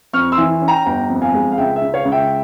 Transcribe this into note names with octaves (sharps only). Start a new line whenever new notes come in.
F2 C#6 F6
C6 E6
E3
C#4
G5 A#5
G1 G5 A#5
F2
F5 G#5
G#3
F5
C#2 E5 G5
E5
C#3
C#5 F5
C#2
E5 G5